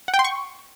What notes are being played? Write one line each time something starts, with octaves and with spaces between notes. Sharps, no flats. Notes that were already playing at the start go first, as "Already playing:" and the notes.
F#5
G5
C6
C#6